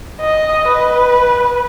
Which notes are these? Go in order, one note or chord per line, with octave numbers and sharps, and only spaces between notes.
D#5
B4